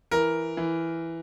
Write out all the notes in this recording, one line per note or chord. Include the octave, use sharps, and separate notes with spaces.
E3 A#4
E3